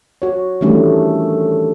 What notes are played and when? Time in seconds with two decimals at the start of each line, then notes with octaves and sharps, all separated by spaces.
0.22 F#4 C#5
0.61 D#3 E3 G3 A3 C#4 D4